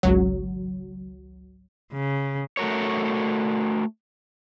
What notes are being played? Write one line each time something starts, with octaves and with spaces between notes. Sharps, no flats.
G#1 C#2 F#3
C#3
A3 F#4 A#4 C#5